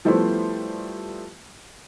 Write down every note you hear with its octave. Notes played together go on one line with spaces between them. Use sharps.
F3 G3 A3 B3 E4 C5